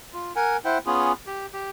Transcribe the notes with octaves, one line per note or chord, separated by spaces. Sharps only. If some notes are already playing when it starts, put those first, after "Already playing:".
F4
A#4 F#5 G#5
E4 C5 F#5 G5
B3 C#4 F4 G#4
G4
G4